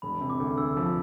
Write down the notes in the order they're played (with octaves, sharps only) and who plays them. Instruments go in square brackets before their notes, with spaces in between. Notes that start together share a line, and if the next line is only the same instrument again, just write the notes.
[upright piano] E1 [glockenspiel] B5
[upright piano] C3
[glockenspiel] D6
[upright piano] D2
[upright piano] D2 [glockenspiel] E6
[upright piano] F3